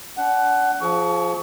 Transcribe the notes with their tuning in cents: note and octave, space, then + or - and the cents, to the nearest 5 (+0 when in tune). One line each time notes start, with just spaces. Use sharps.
D4 -40 F#5 +15
F3 +0 G#4 +35 C#6 +30